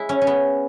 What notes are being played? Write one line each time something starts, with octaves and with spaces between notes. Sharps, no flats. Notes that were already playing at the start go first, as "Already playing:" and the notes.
Already playing: G#3 E4
C#4
C#4
B3